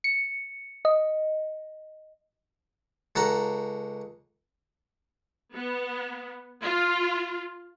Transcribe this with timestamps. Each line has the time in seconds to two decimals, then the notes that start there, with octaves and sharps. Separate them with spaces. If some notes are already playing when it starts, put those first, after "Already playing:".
0.04 C#7
0.85 D#5
3.16 C#2 A4 F#5 A#5
5.54 B3
6.62 F4